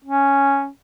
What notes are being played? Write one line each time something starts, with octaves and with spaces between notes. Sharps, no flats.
C#4